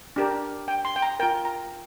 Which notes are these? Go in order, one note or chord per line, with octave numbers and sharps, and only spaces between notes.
D4 G4 A#4
G5
C6
G5
A#5
F4 A#4 G5
A#5